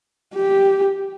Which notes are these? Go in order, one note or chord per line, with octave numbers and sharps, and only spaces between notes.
G4